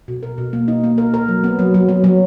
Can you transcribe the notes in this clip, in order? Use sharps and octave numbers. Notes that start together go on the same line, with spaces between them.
B2
A#4
B2
A#3
D#4
A#3
A#4
A#4
F#3
B3
F#3
F#3
F#3
F#3